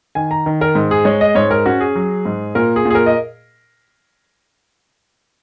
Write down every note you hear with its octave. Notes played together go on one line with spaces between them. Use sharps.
D#3 G#5
A#5
D#3
A#4
G#2
G#4
G#3 C#5
D#5
G#2 C#5
A#4
C#4 F#4
G#4
F#3
G#2
A#2 A#4
G#4
A#2
G#4
A#4
D#5